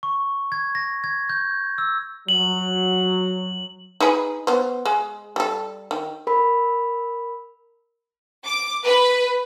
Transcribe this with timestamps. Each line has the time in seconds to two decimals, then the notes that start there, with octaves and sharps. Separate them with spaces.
0.03 C#6
0.52 G#6
0.75 A#6
1.04 G#6
1.29 G6
1.78 E6
2.28 F#3 F#7
4.00 D#4 G#4 B4
4.47 B3 C5
4.85 G#3
5.36 G3 A4
5.91 D#3
6.27 A#4 B5
8.45 D6
8.84 B4